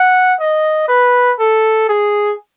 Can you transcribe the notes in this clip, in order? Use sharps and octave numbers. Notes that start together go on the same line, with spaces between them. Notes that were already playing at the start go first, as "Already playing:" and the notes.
Already playing: F#5
D#5
B4
A4
G#4